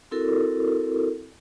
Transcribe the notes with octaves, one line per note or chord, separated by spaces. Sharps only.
C4 E4 F#4 A4 A#4